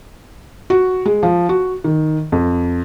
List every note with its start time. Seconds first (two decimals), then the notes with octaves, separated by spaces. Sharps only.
0.70 F#4
1.05 G#3
1.23 F3
1.49 F#4
1.84 D#3
2.32 F2